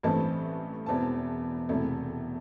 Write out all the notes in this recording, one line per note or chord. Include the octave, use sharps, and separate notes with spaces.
A1 G2 E3 A3 C4 A5
E1 E2 E3 C4 A5
E1 E2 C3 A3